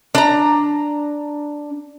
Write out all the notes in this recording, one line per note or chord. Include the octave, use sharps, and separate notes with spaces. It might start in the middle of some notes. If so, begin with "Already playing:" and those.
D4 A#5